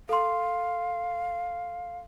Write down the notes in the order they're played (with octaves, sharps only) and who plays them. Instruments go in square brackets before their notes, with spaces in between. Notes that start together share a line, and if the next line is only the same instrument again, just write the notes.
[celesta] A4 C6 [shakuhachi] F5